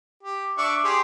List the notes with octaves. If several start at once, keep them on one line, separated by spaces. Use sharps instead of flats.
G4
D4 E5 C#6
G4 G#4 C6